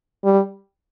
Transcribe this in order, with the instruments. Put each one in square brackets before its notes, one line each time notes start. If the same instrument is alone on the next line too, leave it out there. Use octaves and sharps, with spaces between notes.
[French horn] G3